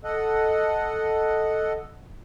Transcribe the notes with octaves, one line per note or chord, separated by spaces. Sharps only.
A4 D#5 F#5